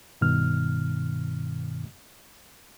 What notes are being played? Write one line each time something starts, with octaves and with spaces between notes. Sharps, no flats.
G2 B2 D#3 F6